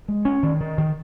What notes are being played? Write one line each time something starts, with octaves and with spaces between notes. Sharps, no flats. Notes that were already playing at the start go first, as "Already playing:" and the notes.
G#3
C#4
D#3
D#3
D#3